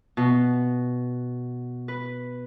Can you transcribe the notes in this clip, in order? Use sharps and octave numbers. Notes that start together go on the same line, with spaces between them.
B2
B4